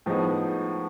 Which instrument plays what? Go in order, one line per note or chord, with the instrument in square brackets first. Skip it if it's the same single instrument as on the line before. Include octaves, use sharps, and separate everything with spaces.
[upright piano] A2 F3 G#3 B3 D#4